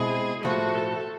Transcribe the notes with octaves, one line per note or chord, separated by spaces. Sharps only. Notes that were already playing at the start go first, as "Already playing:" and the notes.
Already playing: B2 G#3 C4 E4 G#4
A2 F3 A3 F#4
A4